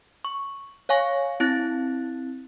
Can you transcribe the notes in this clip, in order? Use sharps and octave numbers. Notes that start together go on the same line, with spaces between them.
C#6
C#5 F5 G#5 C#6 A#6
C4 E4 F#6 A6